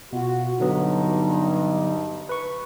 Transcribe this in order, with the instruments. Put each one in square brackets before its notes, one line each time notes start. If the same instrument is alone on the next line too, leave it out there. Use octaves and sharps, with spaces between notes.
[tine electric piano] B2 [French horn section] F4 F#4
[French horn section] G2 D#4 [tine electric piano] D3 F#3 B3
[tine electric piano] B4 C#6